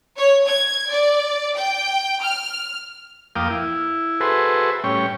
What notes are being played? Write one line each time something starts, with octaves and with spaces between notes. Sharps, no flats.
C#5
G#6
D5
G5
F6
F2 A#3 F5 G5 D6 D#6
E4
F#4 G#4 A4 B4 C5 E5
A2 G3 C#4 C#5 G5